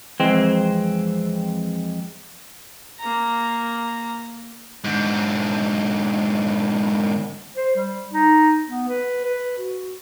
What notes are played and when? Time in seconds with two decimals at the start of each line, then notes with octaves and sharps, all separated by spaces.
0.20 F2 E3 G#3 C4
2.99 A#3 A#5
4.84 G#2 D3
7.56 C5
7.76 G3
8.13 D#4
8.67 B3
8.88 B4
9.24 B4
9.58 F#4